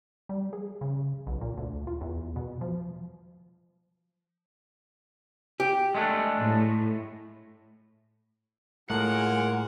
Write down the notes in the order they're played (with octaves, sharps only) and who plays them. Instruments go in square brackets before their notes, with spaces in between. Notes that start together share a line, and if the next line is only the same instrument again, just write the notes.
[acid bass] G3
G#4
C#3
B1
A#2
D2
F4
E2
B2
F3
[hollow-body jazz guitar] G4
[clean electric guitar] G#3 A3 D4
[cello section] A2
[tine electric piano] A2 [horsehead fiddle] G#3 [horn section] A#3 F4 A#4 [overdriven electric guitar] F#5